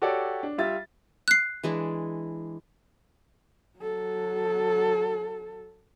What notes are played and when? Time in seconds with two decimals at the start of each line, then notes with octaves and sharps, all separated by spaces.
0.02 F#4 G4 A4 C#5 D5
0.43 D4
0.58 G3 F4 E5 A6
1.28 F#6 C7
1.63 E3 G#3 D4
3.79 F#3 A4